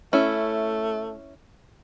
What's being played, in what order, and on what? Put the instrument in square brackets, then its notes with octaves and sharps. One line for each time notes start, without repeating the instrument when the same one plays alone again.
[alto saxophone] A3 [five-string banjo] C#4 E4